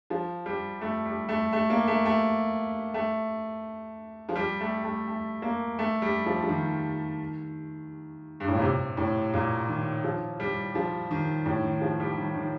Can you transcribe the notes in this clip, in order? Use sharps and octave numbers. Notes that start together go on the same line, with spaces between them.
F3
G3
A3
G3
A3
A3
A#3
A3
A3
A3
F3
G3
A3
A3
A3
A#3
A3
G3
F3
F3
D#3
G2
A2
A#2
C3
A2
A#2
D#3
F3
G3
F3
D#3
A2
D#3
F3
G3
D#3
D#3